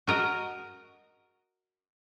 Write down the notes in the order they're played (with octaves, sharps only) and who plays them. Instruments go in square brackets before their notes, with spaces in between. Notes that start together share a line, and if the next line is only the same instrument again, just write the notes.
[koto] F#4 A#4 D#5